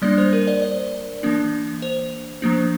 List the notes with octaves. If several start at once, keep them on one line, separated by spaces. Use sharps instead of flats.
G3 A#3 D4 D5
C5
A#4
D5
D5
E3 A#3 D4
C5
F3 A#3 D4